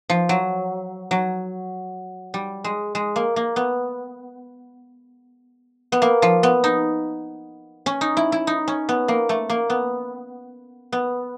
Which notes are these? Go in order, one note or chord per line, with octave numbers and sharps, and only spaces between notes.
F3
F#3
F#3
G3
G#3
G#3
A#3
A#3
B3
B3
A#3
F3
B3
D#4
C#4
D#4
E4
E4
D#4
C#4
B3
A#3
A3
A#3
B3
B3